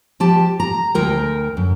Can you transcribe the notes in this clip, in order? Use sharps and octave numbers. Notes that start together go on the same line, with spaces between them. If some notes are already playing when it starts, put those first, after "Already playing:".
F3 G4 A5
A#5
D2 A#4 G5
F#2